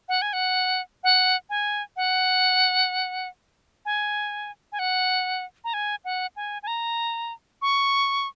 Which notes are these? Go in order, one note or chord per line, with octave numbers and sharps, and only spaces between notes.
F#5
G#5
F#5
F#5
G#5
F#5
G#5
G#5
F#5
A#5
G#5
F#5
G#5
G#5
A#5
C#6